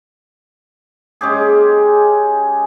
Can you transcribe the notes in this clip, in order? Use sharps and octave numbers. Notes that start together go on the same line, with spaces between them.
G#3 C#4 G4 G#4